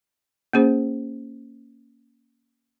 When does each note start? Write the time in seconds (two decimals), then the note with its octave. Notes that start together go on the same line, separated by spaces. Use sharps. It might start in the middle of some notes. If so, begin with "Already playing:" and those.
0.53 A#3 C#4 G#4 C5